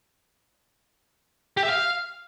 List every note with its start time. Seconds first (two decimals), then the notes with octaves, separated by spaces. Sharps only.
1.57 G4
1.63 E5
1.69 F5